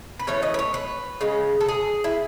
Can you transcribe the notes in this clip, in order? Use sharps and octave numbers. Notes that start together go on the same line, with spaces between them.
B4
E3 A3 C#4 C#5
D#5
B4
C#5
B4
C#3 G#3 C#4
A4
G#4
E4